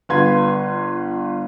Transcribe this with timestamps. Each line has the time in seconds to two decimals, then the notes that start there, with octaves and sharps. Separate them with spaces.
0.09 G1 F4 B4 C6 G#6